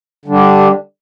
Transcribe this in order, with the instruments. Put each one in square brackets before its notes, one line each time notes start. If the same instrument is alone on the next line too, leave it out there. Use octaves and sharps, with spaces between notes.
[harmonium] D3 G3 D4